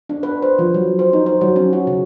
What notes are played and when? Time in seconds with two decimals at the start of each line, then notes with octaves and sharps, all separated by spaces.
0.09 D4
0.23 B4
0.42 C5
0.59 F3
0.74 F#3
0.99 C5
1.13 D#4
1.26 C5
1.41 F#3
1.56 C#4
1.73 F#4
1.87 C#3